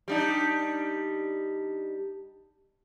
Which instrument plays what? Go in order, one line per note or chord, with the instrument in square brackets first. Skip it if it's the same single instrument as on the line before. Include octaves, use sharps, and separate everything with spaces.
[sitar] G3 D4 D#4